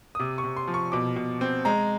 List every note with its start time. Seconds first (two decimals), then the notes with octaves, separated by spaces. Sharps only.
0.15 D#6
0.20 C3 D6
0.38 C#6
0.44 C3
0.57 C6
0.67 F3
0.74 C#6
0.92 B2 D6
1.16 B2
1.41 C4
1.65 G#3 A#5